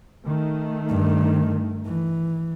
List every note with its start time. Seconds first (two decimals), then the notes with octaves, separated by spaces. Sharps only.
0.25 D#3 A3
0.89 G2
1.86 E3